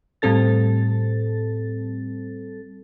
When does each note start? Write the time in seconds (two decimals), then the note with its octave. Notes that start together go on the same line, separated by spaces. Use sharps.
0.22 A2 G3 C4 A4 A6